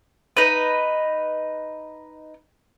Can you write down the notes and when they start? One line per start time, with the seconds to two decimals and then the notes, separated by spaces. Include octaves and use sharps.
0.37 D#4 B4